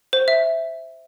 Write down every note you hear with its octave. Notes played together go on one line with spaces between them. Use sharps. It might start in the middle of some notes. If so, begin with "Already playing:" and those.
C5
E5